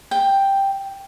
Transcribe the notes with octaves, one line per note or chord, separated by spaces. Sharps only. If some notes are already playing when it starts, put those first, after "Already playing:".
G5